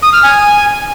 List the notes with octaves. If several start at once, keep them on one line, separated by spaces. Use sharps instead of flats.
D#6
F6
G#5